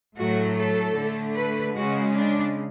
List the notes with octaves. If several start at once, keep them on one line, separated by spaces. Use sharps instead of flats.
A2 F#3 A3 F#4
A4
D3 A3
B4
C#3 G#3 F#4
D4